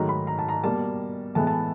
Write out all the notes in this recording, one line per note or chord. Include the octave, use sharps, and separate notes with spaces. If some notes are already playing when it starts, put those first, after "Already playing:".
Already playing: G#2 D#3 F#3 A3 A#5
B5
A#5
A5
A#5
B2 G3 A#3 A5
A2 E3 G#3 B3 A5
A5